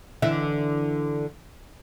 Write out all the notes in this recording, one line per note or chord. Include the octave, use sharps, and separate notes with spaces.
D3 E3 E5